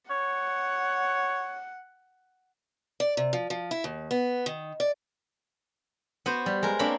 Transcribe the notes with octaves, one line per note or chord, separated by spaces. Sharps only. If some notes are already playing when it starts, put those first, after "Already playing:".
C#5 F#5
D5
C3
F3
F3
E4
D#2
B3
D#3
D5
B3 F#4 C5
G3
G#3 A#4
A#3 C4 D4 C#5 B5